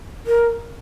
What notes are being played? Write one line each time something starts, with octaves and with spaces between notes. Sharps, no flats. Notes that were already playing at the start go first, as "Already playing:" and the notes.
A#4